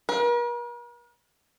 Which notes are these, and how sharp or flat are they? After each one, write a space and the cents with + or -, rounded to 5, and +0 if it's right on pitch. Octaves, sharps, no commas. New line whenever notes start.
A#4 +45